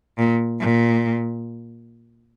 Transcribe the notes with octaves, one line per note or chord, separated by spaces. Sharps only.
A#2
A#2